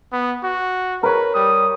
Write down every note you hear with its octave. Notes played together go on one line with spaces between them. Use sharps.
B3
F#4
A#4 B4 C#5
G3 D#6